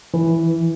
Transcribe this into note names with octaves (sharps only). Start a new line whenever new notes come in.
E3